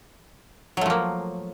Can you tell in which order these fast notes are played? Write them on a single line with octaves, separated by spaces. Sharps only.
F#3 A3 F3 A#3